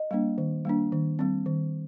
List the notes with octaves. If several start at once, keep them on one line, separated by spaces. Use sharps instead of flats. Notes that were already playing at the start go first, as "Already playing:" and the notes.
Already playing: D#5
G3 A#3 D4
D#3
G3 A#3 D4
D#3
G3 C4
D#3